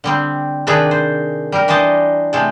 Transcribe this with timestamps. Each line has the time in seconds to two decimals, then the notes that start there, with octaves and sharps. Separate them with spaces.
0.04 D3 G3 C4
0.67 C3 D#3 D4 G#4 A4 B4
0.91 C5
1.52 G3 A#4
1.68 E3 D4 C5 D#5 A5
2.33 C3 G#3 A3 A4